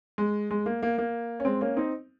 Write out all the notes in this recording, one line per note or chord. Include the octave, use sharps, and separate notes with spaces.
G#3
G#3
A#3
A#3
A#3
C#4
G#3 C4
A#3 C#4
C4 D#4